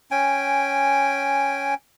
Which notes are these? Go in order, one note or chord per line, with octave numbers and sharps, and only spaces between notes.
C#4 G5 G#5